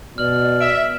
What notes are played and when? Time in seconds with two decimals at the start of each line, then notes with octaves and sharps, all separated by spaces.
0.18 B2 D5 F6 F#7
0.61 E5 D7